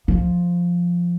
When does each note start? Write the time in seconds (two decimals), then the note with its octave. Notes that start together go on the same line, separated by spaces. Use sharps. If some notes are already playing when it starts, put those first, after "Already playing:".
0.08 F3